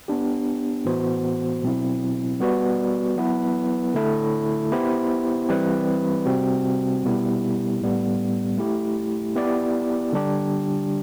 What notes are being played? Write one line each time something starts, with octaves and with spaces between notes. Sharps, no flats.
B3 D4 G4
A2 E3 B3 F#4 C5
B2 F#3 C4 E4
G3 B3 F#4 B4 D5
F#3 B3 E4 B4
D3 A3 E4 A4
B3 E4 G4 C5
E3 G3 C4 E4 B4
C3 G3 C4 F#4
B2 G3 B3 E4 G4
A2 G3 B3
A3 E4 G4
B3 E4 G4 D5
D3 G3 D4 G4